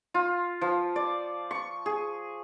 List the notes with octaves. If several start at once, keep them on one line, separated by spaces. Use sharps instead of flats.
F4
F3
D5
C#6
G#4